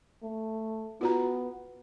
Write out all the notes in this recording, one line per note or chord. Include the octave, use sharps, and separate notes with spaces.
A3
B3 F4 F#4 A#5